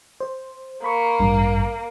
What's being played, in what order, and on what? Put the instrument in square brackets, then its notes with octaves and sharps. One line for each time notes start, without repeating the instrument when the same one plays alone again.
[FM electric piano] C5
[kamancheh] A#3 [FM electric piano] B5 C#6
[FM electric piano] A1 G2